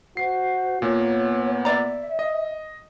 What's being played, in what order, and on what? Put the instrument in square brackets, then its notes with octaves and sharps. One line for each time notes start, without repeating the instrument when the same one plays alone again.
[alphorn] F#4 [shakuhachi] C5 [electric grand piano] C7
[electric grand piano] A#2 A#3 [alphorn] B3 [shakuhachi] C#5
[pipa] D5 A#5 [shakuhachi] E5
[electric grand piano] D#5